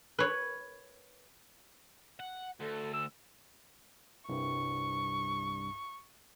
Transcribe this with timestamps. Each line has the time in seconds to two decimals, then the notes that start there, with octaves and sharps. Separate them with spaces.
0.19 B4 C#5
2.20 F#5
2.60 D2 A4
2.94 E6
4.29 C2 G2 C#6